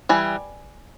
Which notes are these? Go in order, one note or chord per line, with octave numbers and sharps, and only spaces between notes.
E3 G3 G#5